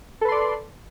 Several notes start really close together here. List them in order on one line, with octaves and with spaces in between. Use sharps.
A4 B4 C6 D5